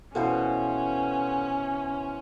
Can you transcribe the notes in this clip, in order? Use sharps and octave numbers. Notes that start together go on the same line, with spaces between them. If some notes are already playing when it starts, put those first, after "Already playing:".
B2 E3 C#4 A4 C5 F5 F#5